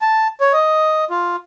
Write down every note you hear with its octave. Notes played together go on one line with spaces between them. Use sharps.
A5
C#5
D#5
F4